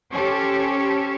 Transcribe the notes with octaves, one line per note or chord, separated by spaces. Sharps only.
C#4 G4 A4 C5 C#5